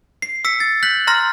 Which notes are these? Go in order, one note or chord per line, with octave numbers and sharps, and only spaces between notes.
C7
E6 B6 C#7
A6
F#6 G6 B6 F#7
A#5 C6 F6 A#6